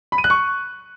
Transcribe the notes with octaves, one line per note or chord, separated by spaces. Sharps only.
B5
D#7
F#6
C#6